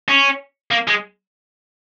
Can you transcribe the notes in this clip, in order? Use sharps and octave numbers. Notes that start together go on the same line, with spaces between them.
C#4
A#3
G#3